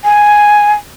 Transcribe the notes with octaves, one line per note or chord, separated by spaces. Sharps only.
G#5